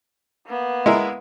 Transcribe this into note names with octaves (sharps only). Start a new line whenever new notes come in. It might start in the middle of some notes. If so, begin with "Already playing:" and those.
A#3 B3
G#3 E4 A#4